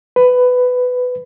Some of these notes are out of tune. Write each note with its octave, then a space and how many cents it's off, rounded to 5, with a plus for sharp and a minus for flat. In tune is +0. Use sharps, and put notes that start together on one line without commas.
B4 +15